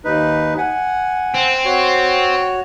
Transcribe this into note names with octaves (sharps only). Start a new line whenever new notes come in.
D#2 D#4 B4
F#5 G#5
C4
F#4 C#5